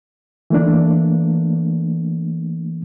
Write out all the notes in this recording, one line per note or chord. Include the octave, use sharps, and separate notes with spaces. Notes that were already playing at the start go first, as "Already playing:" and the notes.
E3 A3 A#3 D4